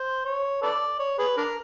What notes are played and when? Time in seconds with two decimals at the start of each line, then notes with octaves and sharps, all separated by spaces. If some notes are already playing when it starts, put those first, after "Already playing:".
Already playing: C5
0.25 C#5
0.62 A4 B4 D5
0.99 C#5
1.19 G#4 B4
1.37 D4 A#4